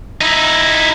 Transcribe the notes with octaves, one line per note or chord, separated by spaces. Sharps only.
D#4 E4